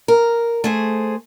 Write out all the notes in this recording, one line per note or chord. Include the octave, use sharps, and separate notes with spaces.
A#4
A3 G#4 C5